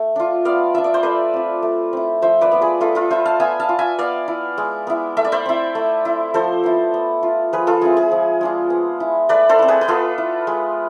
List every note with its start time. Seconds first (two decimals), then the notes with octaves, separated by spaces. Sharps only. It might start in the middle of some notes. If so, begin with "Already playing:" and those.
Already playing: A3
0.16 D4 F4
0.45 B3 D5 F5
0.74 D4 F4 E5
0.84 D5
0.94 C5
1.03 A3 B4 D5
1.34 C4 F4
1.62 A3
1.93 C4 E4
2.22 F3 C5 E5
2.41 B4 D5
2.52 B3 F4
2.61 G#4 B4
2.80 A3 F4 A4
2.95 F4 A4
3.10 D4 F4 C5 E5
3.25 F5 A5
3.40 B3 E5 G#5
3.60 F5 A5
3.69 F4
3.79 E5 G#5
3.99 B3 D5 F5
4.28 E4
4.58 G#3
4.87 B3 E4
5.17 A3 E5
5.25 D5
5.32 C5 E5
5.46 C4 E4
5.75 A3
6.05 E4
6.34 F3 A4 C5
6.64 B3 E4
6.94 B3
7.23 F4
7.53 F3 G#4 B4
7.67 F4 A4
7.81 G#3 C4 E4 G#4
7.97 G#4
8.11 F3
8.41 G#3 D4 F4
8.70 B3
9.00 E4
9.29 A3 B4 D5
9.49 A4 C5
9.59 C4 E4
9.68 G#4 B4
9.81 B4
9.88 B3 F4 A4
10.18 E4
10.47 G#3